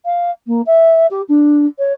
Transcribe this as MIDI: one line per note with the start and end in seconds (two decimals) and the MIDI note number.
0.05 0.31 77
0.47 0.61 58
0.66 1.06 76
1.10 1.21 67
1.28 1.66 62
1.79 1.93 73